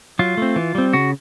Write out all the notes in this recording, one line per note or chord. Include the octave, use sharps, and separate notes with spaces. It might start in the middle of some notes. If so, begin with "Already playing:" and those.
F#3 F4
A3 C4
E3
G3 C4
C#3 F#4